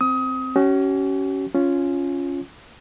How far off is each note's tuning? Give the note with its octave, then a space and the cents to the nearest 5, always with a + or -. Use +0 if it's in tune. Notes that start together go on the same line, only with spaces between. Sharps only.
C4 +0 D#6 +25
C#4 +0 F#4 +45
C#4 +0 F4 +0